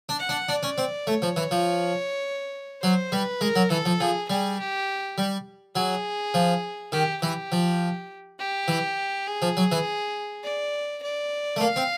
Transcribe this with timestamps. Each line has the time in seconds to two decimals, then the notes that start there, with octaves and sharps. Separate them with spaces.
0.09 D4
0.19 F#5
0.29 D4
0.49 D4 D5
0.63 C#4
0.78 C4
1.07 A3 C#5
1.22 F3
1.36 E3
1.51 F3
2.83 F#3 C5
3.12 G3 B4
3.41 G#3 A#4
3.56 F#3
3.70 E3 A4
3.85 F3
4.00 F3 G#4
4.29 G3 G#4
4.59 G4
5.18 G3
5.76 F#3 G#4
6.34 F3
6.92 D#3 G4
7.22 E3 G4
7.52 F3
8.39 G4
8.68 E3
9.27 G#4
9.42 F3
9.57 F#3
9.72 E3
10.44 D5
11.02 D5
11.56 A3
11.61 A#3 F5
11.76 C4